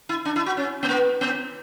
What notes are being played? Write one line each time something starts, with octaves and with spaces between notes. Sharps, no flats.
E4
D4
E4
F#4
C#4
B3
A#3
B3